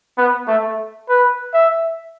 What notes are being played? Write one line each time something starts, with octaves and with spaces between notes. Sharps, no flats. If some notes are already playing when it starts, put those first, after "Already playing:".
B3
A3
B4
E5